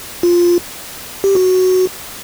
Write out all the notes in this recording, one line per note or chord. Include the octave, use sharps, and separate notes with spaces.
F4
G4
F#4